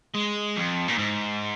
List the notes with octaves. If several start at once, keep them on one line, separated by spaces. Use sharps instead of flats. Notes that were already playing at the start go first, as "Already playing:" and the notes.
G#3
F2
A#2
G#2